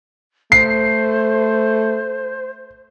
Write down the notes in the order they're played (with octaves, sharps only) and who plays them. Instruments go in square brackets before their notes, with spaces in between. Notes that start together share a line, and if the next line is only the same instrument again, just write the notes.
[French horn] A3 [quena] C5 [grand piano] C7